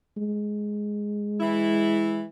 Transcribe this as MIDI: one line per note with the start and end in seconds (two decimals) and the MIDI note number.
0.17 2.23 56
1.40 2.26 52
1.40 2.26 64